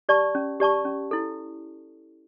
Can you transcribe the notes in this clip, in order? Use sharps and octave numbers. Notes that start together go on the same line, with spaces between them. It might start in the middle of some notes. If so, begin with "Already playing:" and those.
G4 D5 A5 C#6
C#4
G4 D5 A5 C#6
C#4
E4 A4